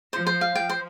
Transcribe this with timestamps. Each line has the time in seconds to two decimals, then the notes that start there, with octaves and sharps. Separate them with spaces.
0.13 F3 C5
0.27 C5
0.41 F5
0.56 F3 G5
0.70 C5